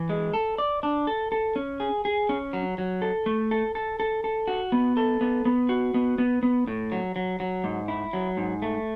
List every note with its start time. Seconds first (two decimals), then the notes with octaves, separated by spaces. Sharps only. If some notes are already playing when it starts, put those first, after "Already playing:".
Already playing: E3
0.09 G#3
0.34 A4
0.58 D5
0.83 D4
1.07 A4
1.32 A4
1.56 C#4
1.80 G#4
2.05 G#4
2.29 C#4
2.53 F#3
2.78 F#3
3.02 A4
3.26 A3
3.51 A4
3.75 A4
4.00 A4
4.24 A4
4.48 F#4
4.72 B3
4.97 A4
5.21 B3
5.45 B3
5.69 F#4
5.94 B3
6.18 B3
6.43 B3
6.67 A2
6.92 F#3
7.16 F#3
7.40 F#3
7.64 G#2
7.88 E4
8.13 F#3
8.37 G#2
8.62 A3